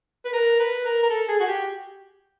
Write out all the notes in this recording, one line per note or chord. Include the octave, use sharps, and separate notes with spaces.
B4
A#4
B4
A#4
A#4
A4
G#4
F#4
G4